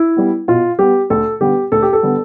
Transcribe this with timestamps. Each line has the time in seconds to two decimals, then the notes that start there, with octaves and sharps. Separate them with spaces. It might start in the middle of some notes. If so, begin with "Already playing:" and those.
Already playing: E4
0.17 G3 B3
0.48 B2 F4
0.79 G3 B3 G4
1.10 D2 A4
1.41 D3 G3 B3 G4
1.72 D2 A4
1.82 G4
1.93 A4
2.03 D3 G3 B3